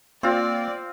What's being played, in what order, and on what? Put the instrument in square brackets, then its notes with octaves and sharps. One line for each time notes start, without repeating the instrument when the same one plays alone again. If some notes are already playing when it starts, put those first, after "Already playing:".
[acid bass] A#3 [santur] C4 F4 [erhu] D5